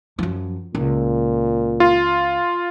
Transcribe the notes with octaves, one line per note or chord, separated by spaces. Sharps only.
F#2 F3
C#2 A#2
F4